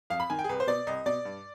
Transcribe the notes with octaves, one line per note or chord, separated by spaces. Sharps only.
F2 F5
B5
D#3 G#5
G5
G#4
C2 B4
C5
B2 D5
C2 D#5
B2 D5
G2